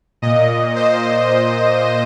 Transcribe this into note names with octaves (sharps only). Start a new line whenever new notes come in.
A#2 D#5
C5